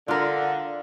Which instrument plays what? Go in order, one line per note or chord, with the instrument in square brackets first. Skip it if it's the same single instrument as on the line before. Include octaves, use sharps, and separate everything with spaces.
[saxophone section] D3 [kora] F4 A#4